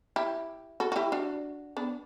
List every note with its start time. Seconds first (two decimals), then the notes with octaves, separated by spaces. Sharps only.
0.16 E4 G4
0.80 F#4 A4
0.92 F#4
0.96 E4 G4
1.12 D4 F#4
1.77 B3 D4